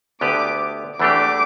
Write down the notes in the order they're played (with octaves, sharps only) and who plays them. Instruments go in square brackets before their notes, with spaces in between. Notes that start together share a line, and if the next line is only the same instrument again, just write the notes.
[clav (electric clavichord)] D2 D3 B3 G4 B4 [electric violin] D6
[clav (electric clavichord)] E2 E3 A3 D4 G4 [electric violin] D6